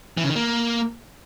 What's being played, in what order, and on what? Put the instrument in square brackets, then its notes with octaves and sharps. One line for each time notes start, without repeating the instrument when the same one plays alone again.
[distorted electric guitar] E3
C#3
D#3
A#3